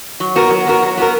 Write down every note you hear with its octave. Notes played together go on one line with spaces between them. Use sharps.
F#3
B3 F#4 A#4
F#3
B3 F#4 A#4
F#3
B3 F#4 A#4